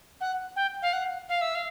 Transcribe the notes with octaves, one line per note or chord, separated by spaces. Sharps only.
F#5
G5
F5
F#5
F5
E5
F5